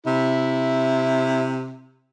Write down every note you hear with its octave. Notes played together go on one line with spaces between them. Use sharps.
C3 E4